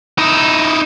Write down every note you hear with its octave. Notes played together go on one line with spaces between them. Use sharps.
D#4 E4